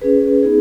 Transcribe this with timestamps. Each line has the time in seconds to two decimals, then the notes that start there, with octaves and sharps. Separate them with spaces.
0.01 C#4 G#4 B4
0.43 B3 D#4 G#4